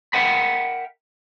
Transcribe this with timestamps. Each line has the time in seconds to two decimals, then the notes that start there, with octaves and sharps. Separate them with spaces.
0.13 A#4 E5 F#5 G5 B5